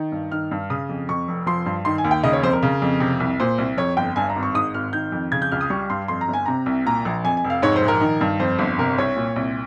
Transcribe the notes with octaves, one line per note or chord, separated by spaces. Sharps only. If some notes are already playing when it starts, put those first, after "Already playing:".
Already playing: D#3
G2
D#3 F6
G2
C#3 D#6
F2
F2 C#6
F1
F3 C6
G2
D#3 C6
G#5
D#2
G5
C#3 D#5
C#5
F2 C5
A#4
C#3
F2
C3
C2
A#2 C5
C2
F2 C#5
G1 G5
G2 G#5
A#5
G#1
C#6
G#2 D#6
G#1 F6
D#3 G6
F2
C#3 G#6
G6
C#2 F6
D#6
G3 C#6
G2 C6
F2 C6
A#5
G1
G#5
C3 A#5
C2
A#2 A#5
A#1
F2 G#5
G#5
F1
F5
G#2 C#5
C5
A#1
A#4
D#3
G2
F2 C5
G1
C3 A#4
C2 C#5
A#2
C2